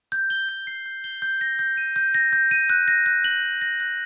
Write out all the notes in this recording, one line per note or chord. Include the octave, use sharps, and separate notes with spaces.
G6
G7
G6
C7
G6
G7
G6
A#6
G6
D#7
G6
A#6
G6
D#7
F#6
A#6
F#6
F#7
F#6
A#6
F#6